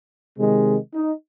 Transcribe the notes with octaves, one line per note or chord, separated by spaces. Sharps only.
C3 D#3 G#3
D#4